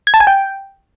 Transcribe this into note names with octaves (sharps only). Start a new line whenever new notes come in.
G#6
A5
G#5
G5